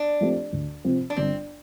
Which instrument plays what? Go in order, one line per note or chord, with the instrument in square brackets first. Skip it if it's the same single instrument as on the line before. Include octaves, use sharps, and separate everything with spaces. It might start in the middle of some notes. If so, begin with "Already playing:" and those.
Already playing: [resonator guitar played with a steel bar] D4
[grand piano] F3 A3 C4 G4
D2
C3 F3 C4
[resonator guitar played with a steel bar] D4
[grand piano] G1 [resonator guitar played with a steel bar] C4